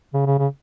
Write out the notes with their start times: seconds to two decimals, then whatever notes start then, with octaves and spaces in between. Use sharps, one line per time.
0.13 C#3
0.26 C#3
0.39 C#3